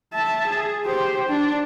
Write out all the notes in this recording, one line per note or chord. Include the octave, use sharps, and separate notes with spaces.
E5 A5
G#4
G4 C5
D4